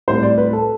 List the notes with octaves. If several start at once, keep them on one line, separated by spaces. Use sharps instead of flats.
A2 G3 C4 C5
D5
B4
A4